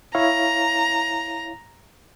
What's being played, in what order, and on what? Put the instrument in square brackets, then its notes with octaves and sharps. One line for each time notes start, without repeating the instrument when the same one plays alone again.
[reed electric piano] E4 C#5 F5 [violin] A#5